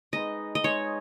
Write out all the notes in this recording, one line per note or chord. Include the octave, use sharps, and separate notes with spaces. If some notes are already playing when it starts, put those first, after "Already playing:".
G#3 D#4 B4 D#5
D#5
G#3 D#4 B4 C#5